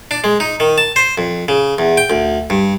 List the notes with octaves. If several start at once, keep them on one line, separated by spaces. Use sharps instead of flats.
D4
G#3
D#4
D#3
A5
C5
F2
C#3
E2
G5
D2
G2